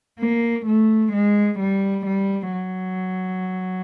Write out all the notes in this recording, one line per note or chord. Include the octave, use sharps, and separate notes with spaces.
A#3
A3
G#3
G3
G3
F#3